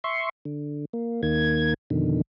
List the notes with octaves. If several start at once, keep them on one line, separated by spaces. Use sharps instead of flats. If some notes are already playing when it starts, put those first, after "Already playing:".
E5 C6 C#6
D3
A#3
D#2 D#3 A#3 G#6
F2 B2 D3 D#3